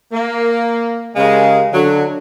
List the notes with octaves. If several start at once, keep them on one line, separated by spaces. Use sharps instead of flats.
A#3
C#3 G#3 G4 A#4 F5
D3 F#3